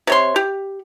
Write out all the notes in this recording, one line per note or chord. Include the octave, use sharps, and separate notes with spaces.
C3 C#5 C6
G4